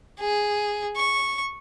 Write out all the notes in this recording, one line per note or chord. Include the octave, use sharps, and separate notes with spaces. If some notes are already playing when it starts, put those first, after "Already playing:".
G#4
C#6